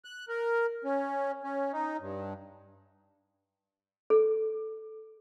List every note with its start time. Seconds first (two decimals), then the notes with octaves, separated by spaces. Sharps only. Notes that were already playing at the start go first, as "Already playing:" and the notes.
0.05 F#6
0.29 A#4
0.84 C#4
1.44 C#4
1.73 D#4
2.00 G2
4.10 A4